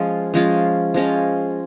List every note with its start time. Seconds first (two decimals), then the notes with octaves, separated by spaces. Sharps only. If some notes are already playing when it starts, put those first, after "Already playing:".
Already playing: F3 G#3 C#4 F4
0.34 F3 G#3 C#4 F4
0.94 F3 G#3 C#4 F4